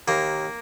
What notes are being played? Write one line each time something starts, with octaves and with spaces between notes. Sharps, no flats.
D#2 A#3